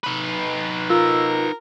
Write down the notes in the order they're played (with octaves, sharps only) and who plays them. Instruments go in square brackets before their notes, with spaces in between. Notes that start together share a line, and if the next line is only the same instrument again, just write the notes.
[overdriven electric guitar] D#4 B4
[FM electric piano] F4 [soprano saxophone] A#4 [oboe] E6